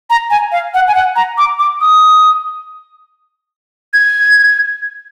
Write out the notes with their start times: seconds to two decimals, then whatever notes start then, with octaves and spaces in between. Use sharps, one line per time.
0.10 A#5
0.30 G#5
0.52 F5
0.74 F#5
0.88 G#5
0.95 F#5
1.16 A#5
1.38 D6
1.59 D6
1.81 D#6
3.94 G#6